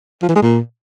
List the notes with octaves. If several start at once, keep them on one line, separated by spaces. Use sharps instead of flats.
F3
E3
G#3
A#2